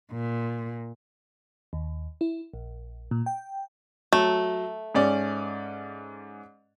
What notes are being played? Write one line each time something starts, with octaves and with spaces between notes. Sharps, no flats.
A#2
D#2
E4
A#1
A#2
G5
F#3 A3
G#2 C#4 D5